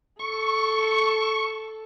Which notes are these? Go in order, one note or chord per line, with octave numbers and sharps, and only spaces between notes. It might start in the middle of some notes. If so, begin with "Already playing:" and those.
A4 C#6